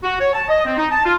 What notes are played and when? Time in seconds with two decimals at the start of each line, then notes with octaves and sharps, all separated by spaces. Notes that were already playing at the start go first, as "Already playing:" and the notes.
0.04 F#4
0.20 C#5
0.34 A5
0.49 D#5
0.66 C4
0.77 D#4
0.91 A5
1.05 F4